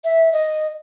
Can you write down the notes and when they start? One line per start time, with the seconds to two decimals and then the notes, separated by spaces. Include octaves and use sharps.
0.04 E5
0.33 D#5